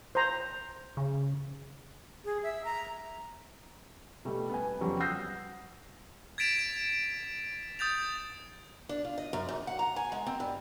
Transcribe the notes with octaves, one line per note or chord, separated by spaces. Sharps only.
C5 A#5
C#3
G#4
E5
A#5
B2 G3 A3
B3 G#5
F2 C#3 F#3 G3 B3 C4
F#5 D#6 E6 G6 A#6 C7
G#6 A6 B6 D7 E7 F7
D#6 G6 A6 F7
D4
F4
D#5
F#2
G#2
F#5
A#5
G#5
G#3
C4
G2